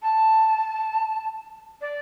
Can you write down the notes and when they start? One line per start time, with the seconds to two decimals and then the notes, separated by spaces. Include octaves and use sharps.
0.02 A5
1.81 D5